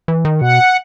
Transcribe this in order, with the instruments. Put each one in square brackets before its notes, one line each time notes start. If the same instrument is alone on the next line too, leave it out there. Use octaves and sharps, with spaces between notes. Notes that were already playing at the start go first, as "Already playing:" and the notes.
[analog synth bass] E3
D#3
[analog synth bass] B2 [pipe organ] F#5